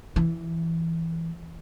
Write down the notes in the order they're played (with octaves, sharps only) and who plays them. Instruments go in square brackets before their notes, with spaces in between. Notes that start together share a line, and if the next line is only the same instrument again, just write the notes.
[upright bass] E3